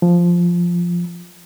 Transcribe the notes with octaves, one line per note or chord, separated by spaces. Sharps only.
F3